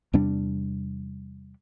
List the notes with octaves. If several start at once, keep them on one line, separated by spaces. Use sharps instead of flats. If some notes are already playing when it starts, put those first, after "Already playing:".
E2 C3 G3 D4